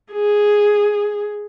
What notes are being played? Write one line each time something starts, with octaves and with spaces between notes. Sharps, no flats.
G#4